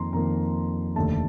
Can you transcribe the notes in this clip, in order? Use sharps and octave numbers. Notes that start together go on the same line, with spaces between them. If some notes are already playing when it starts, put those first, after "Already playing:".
Already playing: F2 D#3 A#3 A#5 C6
F2 D#3 A#3 A#5
F1 D#2 D3 A3 A5